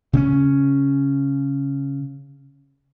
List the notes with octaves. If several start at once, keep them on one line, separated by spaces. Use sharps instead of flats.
C#3 C4 C#4